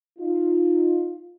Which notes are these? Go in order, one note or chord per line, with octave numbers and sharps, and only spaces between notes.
D#4 F4